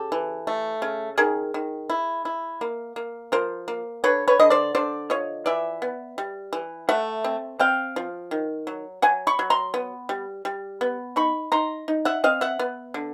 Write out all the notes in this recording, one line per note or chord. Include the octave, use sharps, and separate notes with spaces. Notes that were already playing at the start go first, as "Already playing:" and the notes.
Already playing: C#3 G4 A4
E3
A3
C#3
D#3 G#4 A#4
D#3
E4
E4
A#3
A#3
F3 A#4 C5
A#3
D3 B4 C#5
B4 C#5
D3 D#5
C5 D5
D3 C5 D5
F3 C#5 D#5
E3 D5 E5
B3
G3
E3
A3 E5 F#5
C4
C4 F5 G5
F3
D#3
F#3
F#3 F#5 G#5
B5 C#6
F#3
A#5 C6
B3
G3
G3
B3
D#4 B5 C#6
D#4 A#5 C6
D#4
E5 F#5
C4 D#5 F5
E5 F#5
B3
D3